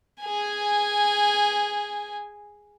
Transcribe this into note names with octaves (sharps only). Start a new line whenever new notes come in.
G#4 G#5